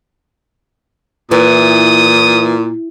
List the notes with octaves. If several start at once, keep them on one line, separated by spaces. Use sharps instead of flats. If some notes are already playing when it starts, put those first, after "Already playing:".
A#2 E3 D#6